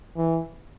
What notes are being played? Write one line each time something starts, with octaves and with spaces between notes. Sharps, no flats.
E3